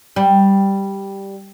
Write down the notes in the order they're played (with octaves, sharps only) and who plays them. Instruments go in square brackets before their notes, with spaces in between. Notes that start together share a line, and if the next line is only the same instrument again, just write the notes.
[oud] G3